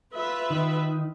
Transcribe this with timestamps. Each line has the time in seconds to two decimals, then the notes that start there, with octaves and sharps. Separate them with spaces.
0.15 F4 B4 E5
0.50 D#3